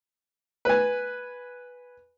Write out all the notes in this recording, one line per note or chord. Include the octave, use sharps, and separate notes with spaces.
B4 G#5